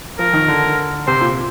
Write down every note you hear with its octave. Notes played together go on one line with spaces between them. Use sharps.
F3 A#4
D#3
D3
C3 C5
A#2